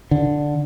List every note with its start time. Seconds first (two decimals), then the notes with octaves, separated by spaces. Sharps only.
0.11 D3